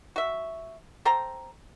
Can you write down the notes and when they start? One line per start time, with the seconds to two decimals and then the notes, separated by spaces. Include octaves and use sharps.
0.16 F#4 E5
1.05 A4 C5 G5 A#5